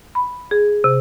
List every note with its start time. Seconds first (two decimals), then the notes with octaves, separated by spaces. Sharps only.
0.15 B5
0.51 G#4
0.84 C3